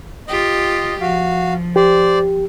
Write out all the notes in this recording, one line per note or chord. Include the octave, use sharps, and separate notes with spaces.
F4 G4 D#5
F3 F#4 F5
G4 C5 D5